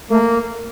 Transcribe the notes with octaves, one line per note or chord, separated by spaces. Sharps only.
A3 A#3